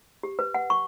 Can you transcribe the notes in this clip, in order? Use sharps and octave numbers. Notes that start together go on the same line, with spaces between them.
G4
B4
F#5
C#6